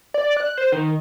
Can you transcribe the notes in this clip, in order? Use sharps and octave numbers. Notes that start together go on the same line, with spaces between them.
D5
F#6
C5
D#3